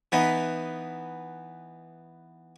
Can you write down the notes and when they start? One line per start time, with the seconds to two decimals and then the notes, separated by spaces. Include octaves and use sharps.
0.12 E3 B3 D#4